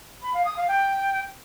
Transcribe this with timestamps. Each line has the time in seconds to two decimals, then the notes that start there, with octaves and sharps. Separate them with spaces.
0.22 B5
0.34 F5
0.45 D#6
0.57 F5
0.68 G5